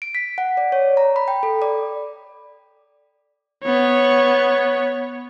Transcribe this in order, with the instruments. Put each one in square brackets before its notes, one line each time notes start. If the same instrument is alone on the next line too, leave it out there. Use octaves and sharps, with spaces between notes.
[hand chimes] D7
B6
F#5
D5
C#5
A#5
B5
G5
A4
D5
[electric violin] B3 C#5